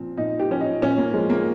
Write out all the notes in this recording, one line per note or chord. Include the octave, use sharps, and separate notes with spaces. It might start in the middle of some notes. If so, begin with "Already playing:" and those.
Already playing: A#2 F3 C4
A#2 D#4
G4
F3 C#4
D#4
A#2 C#4
A#3
F3 G#3
A#3